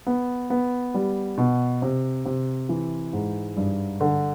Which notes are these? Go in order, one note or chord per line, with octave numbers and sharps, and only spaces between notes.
B3
B3
G3
B2
C3
C3
E3
G#2
G2
D3